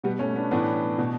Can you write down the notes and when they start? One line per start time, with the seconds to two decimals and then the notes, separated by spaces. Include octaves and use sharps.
0.03 B2 G3 B3
0.19 A3 C#4
0.36 B3 D4
0.51 A2 E3 B3 D4
0.98 B2